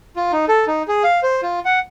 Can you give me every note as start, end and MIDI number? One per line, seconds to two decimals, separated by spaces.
0.16 0.32 65
0.32 0.45 63
0.48 0.65 69
0.67 0.83 63
0.88 1.03 68
1.03 1.20 77
1.23 1.41 72
1.42 1.59 65
1.65 1.79 78